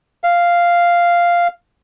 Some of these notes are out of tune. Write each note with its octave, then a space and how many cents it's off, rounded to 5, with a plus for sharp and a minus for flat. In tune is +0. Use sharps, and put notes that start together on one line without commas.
F5 -5